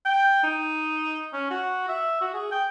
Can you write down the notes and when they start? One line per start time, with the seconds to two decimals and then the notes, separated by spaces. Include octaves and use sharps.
0.06 G5
0.44 D#4
1.33 C#4
1.50 F#4
1.89 E5
2.21 F#4
2.34 G#4
2.52 G5